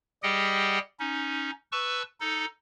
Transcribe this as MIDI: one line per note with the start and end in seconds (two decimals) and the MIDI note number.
0.23 0.79 55
0.23 0.79 67
0.23 0.79 68
0.23 0.79 75
0.23 0.79 78
0.23 0.79 79
0.99 1.51 61
0.99 1.51 63
1.72 2.02 71
1.72 2.02 81
1.72 2.02 85
1.72 2.02 88
2.20 2.45 63
2.20 2.45 69